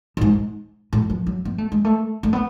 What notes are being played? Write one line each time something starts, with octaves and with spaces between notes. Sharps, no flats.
A2
G#2
A2
F3
F#3
B3
A3
G#3
A3
A3
B3